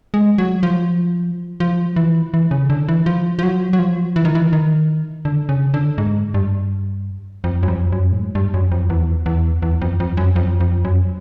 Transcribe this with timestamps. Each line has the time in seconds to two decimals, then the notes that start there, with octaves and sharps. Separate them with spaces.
0.14 G#3
0.38 F#3
0.63 F3
1.60 F3
1.96 E3
2.34 E3
2.51 C#3
2.70 D3
2.89 E3
3.06 F3
3.39 F3
3.43 F#3
3.73 F#3
3.79 F3
4.16 E3
4.25 D#3
4.35 E3
4.53 D#3
5.25 D3
5.49 C#3
5.74 D3
5.98 G#2
6.34 G2
7.44 F2
7.63 F#2
7.68 F2
7.92 F#2
8.12 A2
8.18 G#2
8.35 G2
8.54 F#2
8.72 F2
8.90 E2
9.26 E2
9.62 E2
9.82 F2
10.00 F2
10.17 F#2
10.36 F2
10.60 F2
10.85 F#2